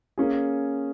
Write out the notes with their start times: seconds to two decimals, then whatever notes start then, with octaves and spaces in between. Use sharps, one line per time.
0.18 A#3 C#4 G#4